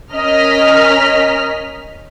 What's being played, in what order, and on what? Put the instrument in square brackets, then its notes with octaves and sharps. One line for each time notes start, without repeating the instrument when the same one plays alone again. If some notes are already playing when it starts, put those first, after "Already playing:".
[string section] C#4 A#4 D#5 F6 B6